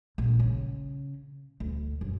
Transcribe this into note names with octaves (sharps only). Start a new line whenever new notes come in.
A#1
C#3
D2
F#2